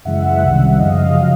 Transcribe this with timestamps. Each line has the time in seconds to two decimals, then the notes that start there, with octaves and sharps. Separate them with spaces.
0.05 F#2 C#3 E3 G#3 E5 F#5
0.42 C2 C3 D#3 G3
0.78 F#2 C#3 F3 G#3 D#5 F5
1.16 C#3 F#3